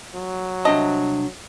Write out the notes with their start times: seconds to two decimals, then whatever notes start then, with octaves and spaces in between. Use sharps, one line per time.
0.15 F#3
0.65 C2 C3 D4 D#5 A5